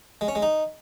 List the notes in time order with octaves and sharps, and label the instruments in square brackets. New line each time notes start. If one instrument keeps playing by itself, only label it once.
[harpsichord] G#3
C#4
G#3
D#4